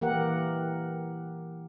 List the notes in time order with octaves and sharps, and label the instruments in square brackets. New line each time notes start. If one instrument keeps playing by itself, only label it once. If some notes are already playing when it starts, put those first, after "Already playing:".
[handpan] E3 A#3 G4 A#4 F#5